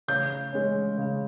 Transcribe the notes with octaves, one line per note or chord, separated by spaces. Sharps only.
C#3 G6
G#3 C#4
C#3